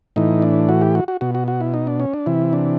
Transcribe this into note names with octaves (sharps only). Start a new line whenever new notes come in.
A2 E3 D#4
D4
F#4
G4
F#4
F#4
B2 F#4
F#4
F#4
E4
D#4
D4
C#4
D4
C3 E3 E4
D4